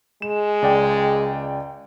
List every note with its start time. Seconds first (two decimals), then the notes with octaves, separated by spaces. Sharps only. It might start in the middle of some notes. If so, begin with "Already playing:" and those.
0.22 G#3 E7
0.62 C#2 D5 G5